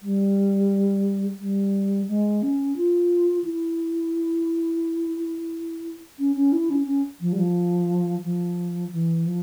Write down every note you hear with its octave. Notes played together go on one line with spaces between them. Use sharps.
G3
G3
G#3
C#4
F4
E4
C#4
C#4
E4
C#4
C#4
F3
G3
F3
F3
E3
F3